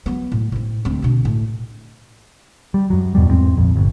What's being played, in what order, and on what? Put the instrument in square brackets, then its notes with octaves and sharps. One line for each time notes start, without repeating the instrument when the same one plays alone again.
[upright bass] F#3 B3
A2
A2 C4
D2 C4
B2 D3
A2
[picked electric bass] G3
F#2 F#3
E2 G2 B2 G3
E2 G#2 C4
A#1 F2
G1